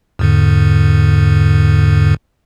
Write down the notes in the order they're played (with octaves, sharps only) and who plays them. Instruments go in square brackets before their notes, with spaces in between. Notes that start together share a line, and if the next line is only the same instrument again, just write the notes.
[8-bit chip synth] E2 G#2 D3